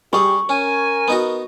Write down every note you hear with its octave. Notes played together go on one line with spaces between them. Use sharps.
G3 G4 G#4 C#6
C#4 A#4 G#5
B3 D#4 F#4